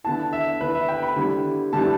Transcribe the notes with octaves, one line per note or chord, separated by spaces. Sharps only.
D3 B3 E4 A5
E5
D3 B3 E4 B4
E5
G5
B5
D3 G3 B3 E4
D3 G3 B3 E4 A5